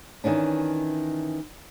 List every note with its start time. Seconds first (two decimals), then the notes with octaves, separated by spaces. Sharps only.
0.24 D#3 E3 C#4 D4